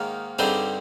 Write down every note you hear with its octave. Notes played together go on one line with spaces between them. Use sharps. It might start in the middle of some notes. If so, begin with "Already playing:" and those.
Already playing: G#2 D#3 A#3
G2 D3 G3 C4 D#4 G#4 C5